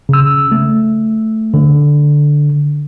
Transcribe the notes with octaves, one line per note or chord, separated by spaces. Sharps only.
C#3 E6
A3
D3